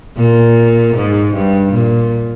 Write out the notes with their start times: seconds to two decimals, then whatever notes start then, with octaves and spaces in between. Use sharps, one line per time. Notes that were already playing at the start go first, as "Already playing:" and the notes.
0.17 A#2
0.95 G#2
1.34 G2
1.72 A#2